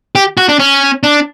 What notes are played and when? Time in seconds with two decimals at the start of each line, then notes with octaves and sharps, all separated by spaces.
0.15 G4
0.37 F#4
0.49 D4
0.59 C#4
1.03 D4